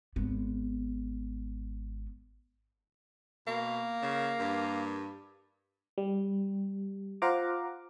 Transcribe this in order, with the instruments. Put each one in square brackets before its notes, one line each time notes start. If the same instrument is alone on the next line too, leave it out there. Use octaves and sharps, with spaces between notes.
[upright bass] G#1 B3
[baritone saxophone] B2 [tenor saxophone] A#3
[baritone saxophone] C#3
G2
[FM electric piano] G3
F4 C5 F5 F#5 A#5 D6